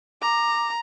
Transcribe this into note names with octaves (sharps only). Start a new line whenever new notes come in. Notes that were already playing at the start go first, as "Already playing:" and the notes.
A#5 D6